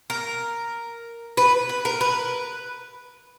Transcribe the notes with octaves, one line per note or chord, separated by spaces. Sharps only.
A#4
B4
B4
A#4
B4